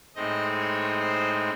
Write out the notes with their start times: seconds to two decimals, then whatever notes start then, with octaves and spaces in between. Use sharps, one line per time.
0.15 A2 G#3 C4 D#4 D#5
0.58 C#5
1.00 C5